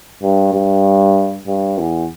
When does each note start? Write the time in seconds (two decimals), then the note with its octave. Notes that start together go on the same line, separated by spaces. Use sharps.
0.23 G2
0.53 G2
1.47 G2
1.78 E2